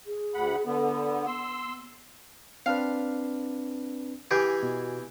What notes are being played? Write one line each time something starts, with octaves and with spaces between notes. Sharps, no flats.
G#4
D2 F#5 B5
D3 B3 A4
B3 C6 E6
C4 D4 B4 F5
E3 G4 G#4
B2